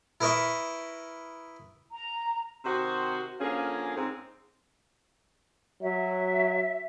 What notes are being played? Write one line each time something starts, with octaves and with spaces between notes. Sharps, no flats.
E4 A#4 B4 D#5 E5 C#6
A#5
C3 D#3 F#4 C5
D3 F3 A#3 C#4 G#4
G#2 C4
F#3 E5